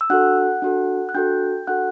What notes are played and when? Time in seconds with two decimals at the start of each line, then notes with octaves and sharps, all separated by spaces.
0.01 E6
0.10 D4 F#4 A4 F#5 F#6
0.62 D4 F#4 A4
1.09 F#6
1.14 D4 F#4 A4 G5 G6
1.67 D4 F#4 A4 F#5 F#6